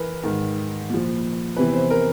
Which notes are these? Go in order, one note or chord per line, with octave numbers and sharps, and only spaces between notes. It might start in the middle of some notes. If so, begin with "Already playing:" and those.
Already playing: E3 A#4 B4
G#2 D#3
A#2 F3
E2 C3 E3 B4
C5
A#4